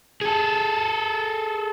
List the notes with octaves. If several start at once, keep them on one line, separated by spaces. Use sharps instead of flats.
G#4 A4